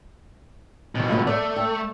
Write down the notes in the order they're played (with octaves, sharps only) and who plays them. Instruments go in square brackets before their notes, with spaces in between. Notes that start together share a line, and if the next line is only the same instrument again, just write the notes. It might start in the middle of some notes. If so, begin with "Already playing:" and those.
[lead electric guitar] G2 B2 [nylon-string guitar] D#3
[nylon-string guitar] F3 A3 B3
[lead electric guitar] A3 [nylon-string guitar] A4 D5 E5
[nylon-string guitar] G5